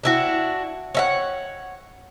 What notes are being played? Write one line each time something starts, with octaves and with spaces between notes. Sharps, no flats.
D4 E4 F#4
C#5 E5 F#5